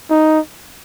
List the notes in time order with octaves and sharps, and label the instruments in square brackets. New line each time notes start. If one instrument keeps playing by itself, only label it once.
[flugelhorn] D#4